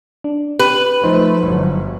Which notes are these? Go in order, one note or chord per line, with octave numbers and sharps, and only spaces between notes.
D4
G4 B4
F3 A3 D#4 C5
G1 F#3